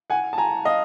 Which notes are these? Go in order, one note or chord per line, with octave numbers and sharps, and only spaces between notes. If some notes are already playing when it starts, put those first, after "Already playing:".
F#5 G#5
A5
G#5 A#5
D#5 F5